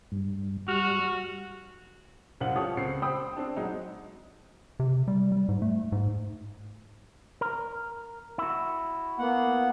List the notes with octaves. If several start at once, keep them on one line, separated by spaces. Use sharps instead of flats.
G2
G3 F#4 F6
C2 F#2 C4 F5 F#5 F#7
C#4 F4 G4 A4 C#5 D#6
C#2 C4 C7
C5 G5 B5 D#6 E6
C4 D4
F#3 G#3 D#4
C3
G3
G3
G#2
A3
G#2
A#4
E4 F#4
A#3 B3 F#5